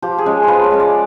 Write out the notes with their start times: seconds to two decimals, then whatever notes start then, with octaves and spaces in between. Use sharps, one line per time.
0.02 F3 G4
0.18 G#4
0.26 G#3 C#4
0.44 F3 B4 C5
0.64 C#5
0.71 G#3 C#4
0.80 D5